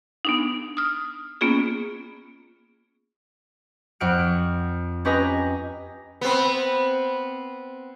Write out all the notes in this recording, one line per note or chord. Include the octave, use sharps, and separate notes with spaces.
B3 D4 D#4
D#6 F6
A#3 B3 C#4 F4 G#4
F2 F#5 F6 D7
C#4 G4 B4 D#5 G#5 A#5
B3 C4